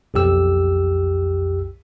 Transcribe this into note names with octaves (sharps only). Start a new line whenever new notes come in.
B1 F2 G4 E6